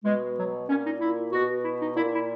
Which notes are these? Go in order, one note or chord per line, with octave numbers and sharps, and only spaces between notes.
B2 G#3
F#3
A#2 C#4
D#4
E4
B2 F#4
E4
D#4
A#2 E4
E4